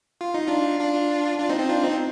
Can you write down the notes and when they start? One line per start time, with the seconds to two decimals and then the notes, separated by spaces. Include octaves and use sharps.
0.21 F4
0.34 D#4
0.48 D4 F4
0.80 D4 F4
1.39 D4 F4
1.49 C4 D#4
1.59 C4 D#4
1.69 D4 F4
1.84 C4 D#4